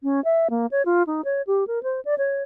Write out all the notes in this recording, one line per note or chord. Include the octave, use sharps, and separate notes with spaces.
C#4
E5
A#3
C#5
F4
D#4
C#5
G4
A#4
C5
D5
C#5